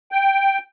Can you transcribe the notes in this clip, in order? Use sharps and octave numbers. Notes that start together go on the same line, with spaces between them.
G5